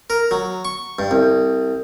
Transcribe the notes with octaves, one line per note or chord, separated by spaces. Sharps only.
A#4
F#3
C#6
G2
C2